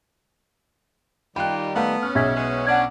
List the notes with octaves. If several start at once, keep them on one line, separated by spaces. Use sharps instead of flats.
D#3 G3 D#4 F4 G4 G5 B5 F#6
A3 B3 F5 F#5
C#4 F6
B1 C#3 E5 G#6 B6
G#3 B3
B3 D4 F#5 G#6